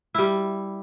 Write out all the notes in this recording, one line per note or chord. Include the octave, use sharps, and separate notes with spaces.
G3 E4